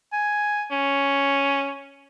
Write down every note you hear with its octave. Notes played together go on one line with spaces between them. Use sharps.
G#5
C#4